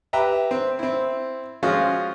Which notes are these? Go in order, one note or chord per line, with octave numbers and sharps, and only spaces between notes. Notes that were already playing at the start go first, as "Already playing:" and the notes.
G4 B4 E5 G5 A#5
C4
C4 E4
F3 G#3 C#4 F4 F#4